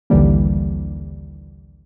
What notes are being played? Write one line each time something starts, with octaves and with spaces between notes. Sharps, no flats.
A#1 D#2 D3 E3 G3 A#3